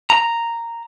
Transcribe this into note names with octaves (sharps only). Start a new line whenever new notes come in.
A#5